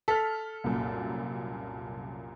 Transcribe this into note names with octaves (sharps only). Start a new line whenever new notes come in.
A4 F6 B6
C2 F#2 A#2